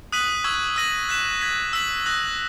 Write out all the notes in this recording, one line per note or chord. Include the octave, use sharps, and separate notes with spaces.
D#6 F#6 B6 D#7 F#7
C#6 E6 G#6
E6 A#6 D#7 F#7
F#6 B6 E7
G#6 B6 F#7
E6 B6 F#7
D#6 F#6 A#6